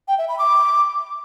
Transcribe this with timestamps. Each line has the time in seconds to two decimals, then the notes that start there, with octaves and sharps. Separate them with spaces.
0.08 G5
0.18 E5
0.29 B5
0.39 D6